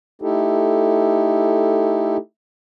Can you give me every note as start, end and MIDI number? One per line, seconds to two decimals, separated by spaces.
0.22 2.17 57
0.22 2.17 63
0.22 2.17 64
0.22 2.17 67
0.22 2.17 69